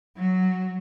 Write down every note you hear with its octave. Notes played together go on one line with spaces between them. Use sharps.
F#3